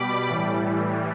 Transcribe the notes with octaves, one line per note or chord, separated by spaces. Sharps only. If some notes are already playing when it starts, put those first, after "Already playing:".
Already playing: B2 G3 B5 D6
A2 E3 G3